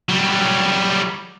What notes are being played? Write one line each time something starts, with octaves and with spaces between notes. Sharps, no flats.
F#3 G3